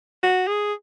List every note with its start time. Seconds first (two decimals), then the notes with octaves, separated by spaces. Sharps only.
0.23 F#4
0.47 G#4